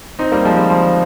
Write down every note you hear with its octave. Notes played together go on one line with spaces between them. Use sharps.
C4 D#4
G3 A#3
F3 G#3
G3
F3